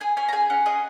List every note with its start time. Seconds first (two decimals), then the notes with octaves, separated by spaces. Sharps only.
0.01 G#4 G#5
0.17 C#4 G#5
0.29 A#5
0.33 G#4 G#5
0.50 C#4 F#5
0.66 G#4 D#5